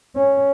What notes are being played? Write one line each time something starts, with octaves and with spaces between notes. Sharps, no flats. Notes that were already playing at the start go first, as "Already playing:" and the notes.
C#4